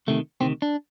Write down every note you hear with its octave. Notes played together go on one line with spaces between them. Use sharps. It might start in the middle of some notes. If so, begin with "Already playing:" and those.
D2 C3 D#3 A3
D2 C3 D#3 C4
D4